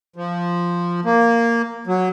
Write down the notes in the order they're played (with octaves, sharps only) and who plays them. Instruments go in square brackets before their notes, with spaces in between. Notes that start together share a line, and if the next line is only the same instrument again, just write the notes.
[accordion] F3
A#3
F#3